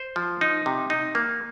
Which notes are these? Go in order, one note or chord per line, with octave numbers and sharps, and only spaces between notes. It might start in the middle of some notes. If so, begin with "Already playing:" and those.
Already playing: C5
F3
D#4
C3
D#4
A#3